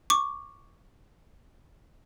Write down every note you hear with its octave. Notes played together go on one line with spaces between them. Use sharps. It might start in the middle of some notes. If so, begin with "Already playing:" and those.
C#6 D6